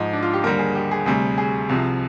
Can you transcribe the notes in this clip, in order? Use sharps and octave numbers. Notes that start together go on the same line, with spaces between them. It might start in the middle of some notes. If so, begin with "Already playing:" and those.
Already playing: G#2 F3 D#4
D4
F4
G4
D#2 D3 G3 A#4
G#4
G4
G#4
D2 C3 G3 G#4
G#4
C2 C3 F3